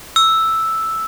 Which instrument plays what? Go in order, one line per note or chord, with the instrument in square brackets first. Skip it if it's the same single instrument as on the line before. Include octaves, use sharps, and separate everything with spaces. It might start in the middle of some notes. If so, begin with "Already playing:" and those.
[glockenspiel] E6